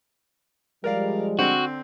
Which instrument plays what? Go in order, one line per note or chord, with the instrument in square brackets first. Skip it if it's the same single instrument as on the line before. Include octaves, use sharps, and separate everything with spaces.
[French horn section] F3 G3 G#3 [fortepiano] A#4 D5 F5
[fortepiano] D3 C4 [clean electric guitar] F#4